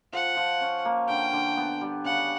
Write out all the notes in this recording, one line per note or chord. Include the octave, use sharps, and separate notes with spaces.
F3 F#5
F3
C#4
A#3
D3 G5
D3
B3
G3
C#3 F#5